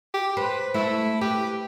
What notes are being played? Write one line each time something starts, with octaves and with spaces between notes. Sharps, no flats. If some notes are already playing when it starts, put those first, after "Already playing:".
G4
B4 C5
A3 E4
G4 B4